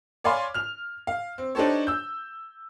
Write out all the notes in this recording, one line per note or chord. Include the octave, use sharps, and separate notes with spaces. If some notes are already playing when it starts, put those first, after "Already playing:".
C#5 D5 F5 G#5 B5 C6
F6 F7
F5
C4
D4 D#4 G4 A4 C5 C#5
E6 G6